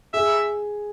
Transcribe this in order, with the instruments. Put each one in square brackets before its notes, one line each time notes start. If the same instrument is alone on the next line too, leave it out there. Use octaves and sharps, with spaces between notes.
[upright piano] G#4 [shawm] E5